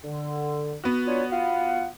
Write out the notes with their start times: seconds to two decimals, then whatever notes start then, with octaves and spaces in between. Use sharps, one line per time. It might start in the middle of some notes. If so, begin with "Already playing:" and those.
0.04 D3
0.84 B3 F#4
1.06 D4 F4 C#5
1.32 F4 F5 F#5